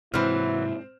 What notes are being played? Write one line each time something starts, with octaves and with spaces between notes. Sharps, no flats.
G#2 C3 E3 F#3 C4 E4 C5 F6